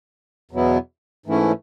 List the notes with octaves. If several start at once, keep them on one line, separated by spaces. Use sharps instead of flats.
E2 B2 F#3 B3 E4
G#2 E3 A3 C#4 E4